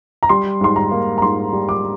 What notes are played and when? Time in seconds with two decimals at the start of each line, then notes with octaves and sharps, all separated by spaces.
0.23 A#5
0.29 G3 C6
0.61 G#2 C6
0.76 A#5
0.91 A#3
1.18 A#5
1.22 G#2 C6
1.53 G3
1.69 D6